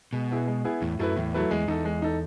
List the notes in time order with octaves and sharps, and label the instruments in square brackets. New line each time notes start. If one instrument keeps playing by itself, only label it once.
[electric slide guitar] B2 [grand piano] G#3
[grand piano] B3 E4 G#4
G#3
B3 E4 G#4
[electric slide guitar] E2 [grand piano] A2
[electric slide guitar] F#2 [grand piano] F#3 A3 E4 B4
[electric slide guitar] E2 [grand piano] A2
[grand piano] F#3 A3 E4 B4
[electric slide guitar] E2 [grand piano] G#3
[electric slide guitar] E2 [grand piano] D#4 A4
[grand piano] G#3
D#4 A4